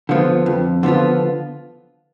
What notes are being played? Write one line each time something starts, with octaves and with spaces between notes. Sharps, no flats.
D3 F3 B3 F4
F2
D3 F3 B3 F4